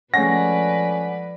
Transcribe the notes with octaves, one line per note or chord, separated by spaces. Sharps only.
F3 G#3 A3 C#4 B4 D5 F#5 A#6